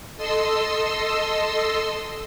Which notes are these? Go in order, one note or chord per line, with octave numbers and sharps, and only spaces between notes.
A4 D#5 C6 E6